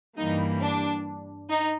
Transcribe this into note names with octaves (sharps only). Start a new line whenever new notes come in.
G2 E3 G3 A#3 D#4
D4
D#4